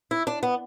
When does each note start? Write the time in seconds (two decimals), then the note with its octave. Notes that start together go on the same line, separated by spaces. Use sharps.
0.11 E4
0.27 D4
0.43 B3